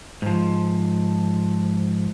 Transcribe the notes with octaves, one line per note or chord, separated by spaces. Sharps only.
G#2 F3